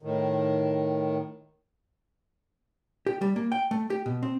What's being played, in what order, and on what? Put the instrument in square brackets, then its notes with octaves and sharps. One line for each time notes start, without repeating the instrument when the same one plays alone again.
[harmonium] A2 D#3
[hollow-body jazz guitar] G4
G3
A#3
G5
A3
G4
B2
C4